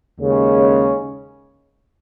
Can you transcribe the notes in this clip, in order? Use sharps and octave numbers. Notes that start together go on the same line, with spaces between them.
D#2 C#3 G#3 C#4